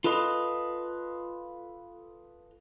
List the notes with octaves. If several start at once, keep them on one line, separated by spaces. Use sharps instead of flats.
F4 A4 B4 D#5